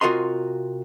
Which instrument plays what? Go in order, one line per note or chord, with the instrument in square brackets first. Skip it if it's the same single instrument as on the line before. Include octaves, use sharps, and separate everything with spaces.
[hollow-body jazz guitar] C3 F4 F#4 A#4 D#5 C6